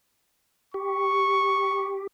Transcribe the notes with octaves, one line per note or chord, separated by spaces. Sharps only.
G4 C#6